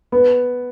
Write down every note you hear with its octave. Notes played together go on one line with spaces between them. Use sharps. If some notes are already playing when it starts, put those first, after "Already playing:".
B3